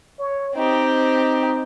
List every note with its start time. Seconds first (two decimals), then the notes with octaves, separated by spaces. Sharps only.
0.19 C#5
0.56 C4 D#4 G4